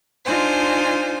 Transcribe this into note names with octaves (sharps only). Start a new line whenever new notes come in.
D4 D#4 F4 C5 G#5